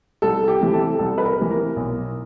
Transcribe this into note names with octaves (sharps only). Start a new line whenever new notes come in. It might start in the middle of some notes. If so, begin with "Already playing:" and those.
C2 A4
G4
C3 E3
A4
C2 A4
B4
A#4
C3 E3
A#4
B1